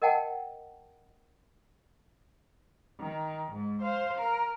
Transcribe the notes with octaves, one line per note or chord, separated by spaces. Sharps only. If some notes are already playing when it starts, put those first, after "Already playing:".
A#4 D#5 F#5 G5 A5
D#3
G#2
C5 F5
A#4